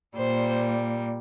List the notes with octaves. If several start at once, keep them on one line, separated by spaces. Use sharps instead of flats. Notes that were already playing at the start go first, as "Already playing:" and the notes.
A#2 G3 C5